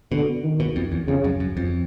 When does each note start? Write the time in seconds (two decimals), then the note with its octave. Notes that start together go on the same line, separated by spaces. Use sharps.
0.12 B2 D3
0.44 D#3
0.60 B2
0.76 F2
0.92 E2
1.07 F2 C#3
1.24 F#2
1.40 F#2
1.57 F2